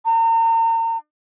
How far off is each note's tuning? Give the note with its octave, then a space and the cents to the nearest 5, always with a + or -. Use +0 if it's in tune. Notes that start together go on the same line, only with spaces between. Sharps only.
A#5 -40